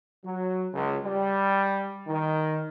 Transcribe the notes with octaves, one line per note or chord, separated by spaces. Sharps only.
F#3
C#2
G3
D#3